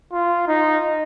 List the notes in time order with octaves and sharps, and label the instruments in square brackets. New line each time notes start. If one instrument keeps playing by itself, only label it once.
[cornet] F4
D#4